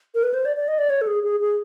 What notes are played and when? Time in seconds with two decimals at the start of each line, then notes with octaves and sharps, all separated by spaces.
0.15 A#4
0.23 B4
0.34 C5
0.45 D5
0.57 D5
0.68 D#5
0.78 D5
0.90 C#5
1.01 A4
1.07 G#4
1.23 G#4
1.40 G#4